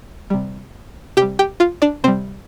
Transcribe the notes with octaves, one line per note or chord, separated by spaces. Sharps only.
C3 G3
C3 G3 G4 G5
G4 G5
F4 F5
D4 D5
C3 G3 C4 C5